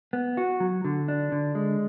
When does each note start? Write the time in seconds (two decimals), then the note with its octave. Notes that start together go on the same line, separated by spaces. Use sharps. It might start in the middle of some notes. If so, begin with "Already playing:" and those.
0.13 B3
0.37 F#4
0.60 F#3
0.85 D3
1.08 D4
1.32 D3
1.55 G#3